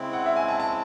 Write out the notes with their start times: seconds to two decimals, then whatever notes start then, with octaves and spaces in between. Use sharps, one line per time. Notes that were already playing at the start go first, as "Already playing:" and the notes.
Already playing: C#3 G#3 C4 E4
0.13 F#5
0.26 E5
0.36 G#5
0.48 A5
0.60 A5